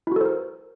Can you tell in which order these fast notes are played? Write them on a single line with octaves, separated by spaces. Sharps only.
E4 F#4 A4 C5 A#4